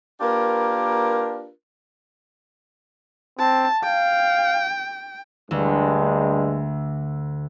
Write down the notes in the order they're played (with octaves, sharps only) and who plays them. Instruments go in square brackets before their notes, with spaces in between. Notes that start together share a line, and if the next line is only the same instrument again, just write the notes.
[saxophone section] A#3 D4 F4 G4 A#4 B4
[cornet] C4 [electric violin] A5
[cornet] F5 [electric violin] G5
[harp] D2 [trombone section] G2 G#3